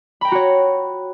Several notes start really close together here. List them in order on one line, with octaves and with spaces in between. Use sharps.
B5 G5 A#5 F#4 C#5